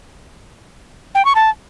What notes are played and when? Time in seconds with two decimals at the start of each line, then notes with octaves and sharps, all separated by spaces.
1.15 G5
1.25 C#6
1.35 A5